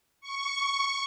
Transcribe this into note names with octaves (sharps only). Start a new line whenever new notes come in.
C#6